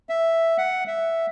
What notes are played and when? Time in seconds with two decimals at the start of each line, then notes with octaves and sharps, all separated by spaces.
0.09 E5
0.58 F#5
0.87 E5